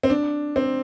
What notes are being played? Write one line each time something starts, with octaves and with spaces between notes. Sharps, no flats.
C4
D4
C4